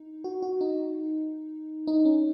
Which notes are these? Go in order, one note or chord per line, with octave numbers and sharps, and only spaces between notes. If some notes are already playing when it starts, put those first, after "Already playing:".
Already playing: D#4
F#4
F#4
D#4
D#4
C#4